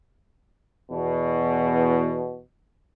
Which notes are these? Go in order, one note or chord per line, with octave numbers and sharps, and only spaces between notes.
E2 B2